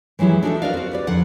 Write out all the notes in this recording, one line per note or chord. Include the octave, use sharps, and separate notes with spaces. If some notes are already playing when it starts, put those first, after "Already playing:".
E3 F#3 G#3 E4 G4
D4 D#4 F#4 G4 A4 E5
F#4 A#4 B4 D5 D#5 F5
C4 F#4
G4 B4 D5
F2 D3 F#5